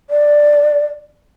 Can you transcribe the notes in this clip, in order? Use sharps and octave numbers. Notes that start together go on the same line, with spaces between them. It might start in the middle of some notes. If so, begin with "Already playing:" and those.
D5